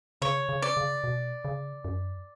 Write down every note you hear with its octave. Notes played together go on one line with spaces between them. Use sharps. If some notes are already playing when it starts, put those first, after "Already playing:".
C#3 C#5
C#3
D5
C#3
B2
C#3
F#2